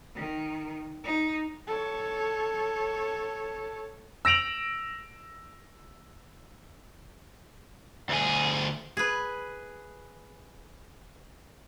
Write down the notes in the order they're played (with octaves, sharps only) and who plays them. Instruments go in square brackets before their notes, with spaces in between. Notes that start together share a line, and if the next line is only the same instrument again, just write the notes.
[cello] D#3
D#4
[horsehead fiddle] A4 C#5
[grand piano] E6 A#6 D7 F7 F#7
[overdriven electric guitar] D2 G#4
[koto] G#4 B4